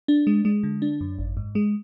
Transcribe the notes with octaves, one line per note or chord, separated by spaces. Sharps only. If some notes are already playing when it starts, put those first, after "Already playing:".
D4
G#3
G#3
D3
D4
F#2
G#1
G#2
G#3